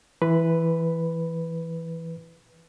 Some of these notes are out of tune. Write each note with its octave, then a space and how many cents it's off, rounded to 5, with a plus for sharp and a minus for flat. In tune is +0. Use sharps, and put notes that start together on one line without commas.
E3 +0 B4 +0 C6 -35